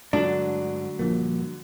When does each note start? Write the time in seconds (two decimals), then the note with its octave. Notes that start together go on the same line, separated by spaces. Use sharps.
0.13 G2 D3 F#3 G#3 A3 D4 F#7
0.99 A#1 G2 F3 A#3